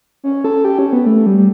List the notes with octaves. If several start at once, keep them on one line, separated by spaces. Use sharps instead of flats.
C#4
A4
G4
C#4
B3
A3
G3
G3